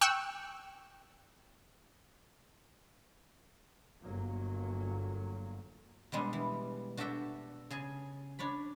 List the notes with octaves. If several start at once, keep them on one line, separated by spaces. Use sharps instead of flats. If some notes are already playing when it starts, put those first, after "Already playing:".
G5 C#6 E6 F#6
G1 F#3 A#3
B2 G3 G#3 D4
E3
D4 F#4 G4 A4 E5 G5
C#3 G#4 G#5 A5
D4 C#5 D5 B5